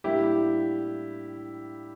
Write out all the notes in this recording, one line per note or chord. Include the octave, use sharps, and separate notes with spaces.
A2 G3 A#3 D4 E4 G4